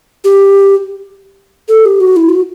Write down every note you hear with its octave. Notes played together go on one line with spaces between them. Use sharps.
G4
A4
G4
F#4
E4
F#4